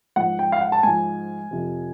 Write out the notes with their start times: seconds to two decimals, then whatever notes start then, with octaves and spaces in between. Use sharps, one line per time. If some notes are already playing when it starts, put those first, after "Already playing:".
0.16 G#2 F3 F#5
0.39 G5
0.52 F5
0.61 F#5
0.72 A5
0.83 G#2 F3 G#5
1.51 F2 C3 F3